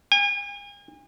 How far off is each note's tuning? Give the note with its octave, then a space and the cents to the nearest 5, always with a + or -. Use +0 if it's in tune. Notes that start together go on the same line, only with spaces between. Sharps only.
G#5 -40